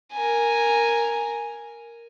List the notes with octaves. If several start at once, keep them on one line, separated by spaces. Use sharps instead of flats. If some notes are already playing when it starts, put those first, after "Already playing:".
A#4 G#5